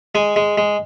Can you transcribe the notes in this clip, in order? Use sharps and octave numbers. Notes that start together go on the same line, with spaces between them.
G#3 G#5
G#3
G#3